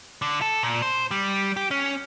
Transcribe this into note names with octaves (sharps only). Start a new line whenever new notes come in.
D3
A4
A#2
C5
G3
G4
C#4